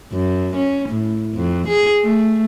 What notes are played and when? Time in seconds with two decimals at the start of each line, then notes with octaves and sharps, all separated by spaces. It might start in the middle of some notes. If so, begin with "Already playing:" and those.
0.12 F#2
0.56 C#4
0.89 A2
1.34 F2
1.68 G#4
2.02 A3